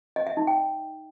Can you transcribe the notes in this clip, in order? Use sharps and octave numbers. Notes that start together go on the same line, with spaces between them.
D#5
E5
D#4
G5